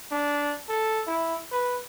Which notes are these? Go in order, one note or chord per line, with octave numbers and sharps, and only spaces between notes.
D4
A4
E4
B4